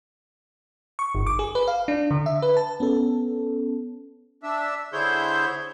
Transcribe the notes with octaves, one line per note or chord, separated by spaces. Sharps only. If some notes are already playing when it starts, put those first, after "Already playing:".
C#6
G1
D6
G#4
B4
F5
D4
D3
E5
B4
A5
B3 C#4 A4
D4 E5
D3 E4 G#4 C5 C#5 G6